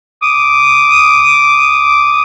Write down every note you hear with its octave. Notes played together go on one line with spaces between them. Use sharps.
D6 D#6